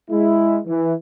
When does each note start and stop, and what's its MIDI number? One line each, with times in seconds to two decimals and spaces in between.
0.10 0.59 56
0.10 0.59 64
0.67 0.93 52